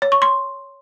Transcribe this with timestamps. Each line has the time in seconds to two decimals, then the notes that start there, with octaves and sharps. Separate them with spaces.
0.02 C#5
0.12 C#6
0.22 C6